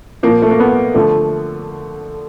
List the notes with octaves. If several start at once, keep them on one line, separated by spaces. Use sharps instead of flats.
A#2 F3 A#3
A3
A#3
B3
D3 F3 A3